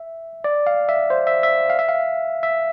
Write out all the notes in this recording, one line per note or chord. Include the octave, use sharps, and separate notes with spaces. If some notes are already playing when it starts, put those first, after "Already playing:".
Already playing: E5
D5
F5
E5
C5
E5
E5
F5
E5
F5
E5